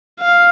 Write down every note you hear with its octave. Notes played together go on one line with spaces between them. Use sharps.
F5